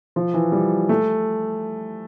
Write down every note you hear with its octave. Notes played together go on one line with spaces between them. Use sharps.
F3
E3
G3
A3